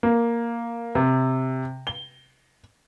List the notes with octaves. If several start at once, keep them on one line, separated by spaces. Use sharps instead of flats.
A#3
C3
G7